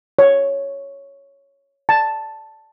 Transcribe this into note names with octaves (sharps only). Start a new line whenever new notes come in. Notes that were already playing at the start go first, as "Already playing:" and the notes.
C#5
A5